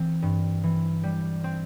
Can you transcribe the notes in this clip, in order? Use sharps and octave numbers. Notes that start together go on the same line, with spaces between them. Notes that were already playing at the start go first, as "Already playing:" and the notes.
Already playing: E3 C4
G2
E3
G3
C4